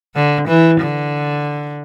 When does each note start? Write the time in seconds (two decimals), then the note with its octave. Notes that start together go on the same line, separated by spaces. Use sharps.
0.15 D3
0.48 E3
0.80 D3